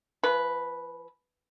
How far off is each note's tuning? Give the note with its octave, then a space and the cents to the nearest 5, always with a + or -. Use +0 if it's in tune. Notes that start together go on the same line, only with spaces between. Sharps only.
F3 -40 B4 +0